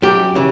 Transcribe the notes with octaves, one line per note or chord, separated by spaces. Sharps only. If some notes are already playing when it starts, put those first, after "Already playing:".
F#2 G4
C#3 E3